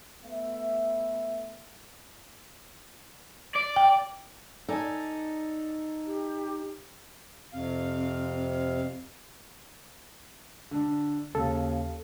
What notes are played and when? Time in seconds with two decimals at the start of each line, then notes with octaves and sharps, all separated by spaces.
0.24 A3 B3 E5
3.56 D5
3.76 G5
4.69 D#4 A4 D5 G#5
6.06 G4
7.53 F2 C3 C4 F5
10.71 D3 D4
11.35 D#2 C#3 A4